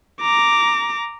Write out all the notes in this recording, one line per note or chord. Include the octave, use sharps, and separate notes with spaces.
A#5 D6